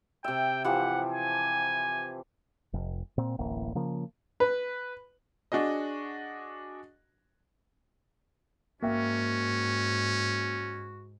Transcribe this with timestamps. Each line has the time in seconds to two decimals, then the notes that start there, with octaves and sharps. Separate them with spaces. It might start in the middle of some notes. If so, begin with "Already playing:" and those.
0.24 C3 E5 G5
0.65 E3 F3 G4 F#5
1.12 G#5
2.74 F1
3.18 A#2 C4
3.38 D1 A1 A#3
3.75 C#3 F3 A#3
4.40 B4
5.52 D4 F#4 G#4 D#5
8.82 G#2 A#3 C#4 F#4 E5 G5